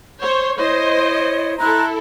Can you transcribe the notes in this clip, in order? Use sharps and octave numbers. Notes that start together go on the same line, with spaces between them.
C5 C#5
E4 C5 C#5 D#5
E4 A4 A#5 C6 F#6